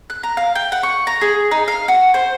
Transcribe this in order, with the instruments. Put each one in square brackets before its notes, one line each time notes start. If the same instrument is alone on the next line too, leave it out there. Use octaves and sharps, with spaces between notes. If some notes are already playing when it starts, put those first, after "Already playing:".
[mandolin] F#6
A#5
F5
G5
F#5
C#6
A#5
G#4
D#4
F5
F#4
C5